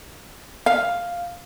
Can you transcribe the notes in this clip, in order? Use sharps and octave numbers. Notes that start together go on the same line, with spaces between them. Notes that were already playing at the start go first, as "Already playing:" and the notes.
F5